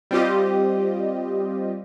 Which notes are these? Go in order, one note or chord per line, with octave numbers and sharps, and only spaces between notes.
G3 C4 F4 G4 D#5